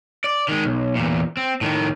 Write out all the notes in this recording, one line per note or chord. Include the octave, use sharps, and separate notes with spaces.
D5
D#3 G#3
B1
E2 A#2
C4
A2 D#3